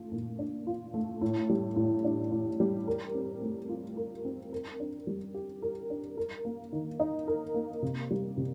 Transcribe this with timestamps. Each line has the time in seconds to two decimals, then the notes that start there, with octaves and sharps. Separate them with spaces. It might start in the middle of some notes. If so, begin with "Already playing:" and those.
Already playing: A3 F4
0.12 A#2
0.39 D4
0.67 F4
0.94 A3
1.21 A2
1.50 G3
1.76 A2
2.04 D4
2.32 A2
2.60 G3
2.87 A#4
3.15 C4
3.42 A3
3.69 F4
3.97 A#4
4.25 C4
4.53 A#4
4.80 D4
5.07 G3
5.34 G4
5.62 A#4
5.90 D4
6.17 A#4
6.45 A#3
6.72 D#3
7.00 D#4
7.28 A#4
7.54 A#3
7.82 C3
8.11 G3
8.37 C3